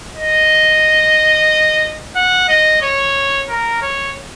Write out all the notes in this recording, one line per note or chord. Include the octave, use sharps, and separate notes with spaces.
D#5
F#5
D#5
C#5
A#4
C#5